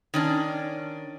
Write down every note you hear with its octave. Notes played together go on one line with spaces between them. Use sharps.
D#3 C#4 D4